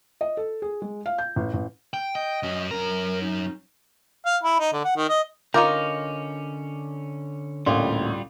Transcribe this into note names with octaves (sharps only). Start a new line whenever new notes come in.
D#5
A4
G#4
G#3
F5
G6
A1
A1
G5
D#5 G5
F#2 C#4
F#2 A#4 A#5
D#4
F5
E4
D#4
D3
F#5
D#3
D#5
D3 C#4 D#4 F4 A#4 D6 G6
A1 D2 A#2 G3 F4 C6